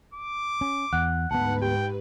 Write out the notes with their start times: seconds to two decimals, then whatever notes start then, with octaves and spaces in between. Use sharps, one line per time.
0.14 D6
0.61 C#4
0.93 E2 F#5 F#6
1.31 D2 G#2 B3 B4 F#5 A5
1.62 G4 G5